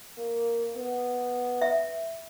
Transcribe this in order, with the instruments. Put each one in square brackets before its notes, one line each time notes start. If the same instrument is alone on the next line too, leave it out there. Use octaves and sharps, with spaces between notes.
[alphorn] A#3
B3
[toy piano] E5